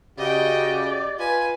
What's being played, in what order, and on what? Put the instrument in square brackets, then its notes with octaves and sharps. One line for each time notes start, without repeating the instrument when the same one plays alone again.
[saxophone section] C#3 G4 [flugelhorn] F#4 [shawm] D5 [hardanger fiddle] D#5 G5
[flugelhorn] F4 [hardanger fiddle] B4 G#5